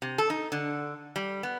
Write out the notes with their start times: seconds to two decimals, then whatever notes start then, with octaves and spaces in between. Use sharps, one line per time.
0.02 C3
0.18 A4
0.30 D#4
0.52 D3
1.16 G3
1.43 B3